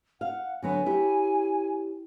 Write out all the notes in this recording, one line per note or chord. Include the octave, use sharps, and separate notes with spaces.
F5 F#5
D3 F#3 B3 G#5
E4 G4 C#5